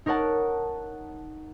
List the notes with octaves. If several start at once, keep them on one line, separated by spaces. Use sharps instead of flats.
D#4 A#4 C#5 F#5 A5